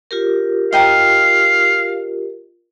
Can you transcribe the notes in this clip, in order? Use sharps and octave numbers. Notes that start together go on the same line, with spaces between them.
F4 G4 A#4
D#5 F5 G5 A#5